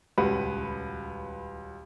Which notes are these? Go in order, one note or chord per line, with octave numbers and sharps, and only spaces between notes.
D#1 C#2 F#4 B4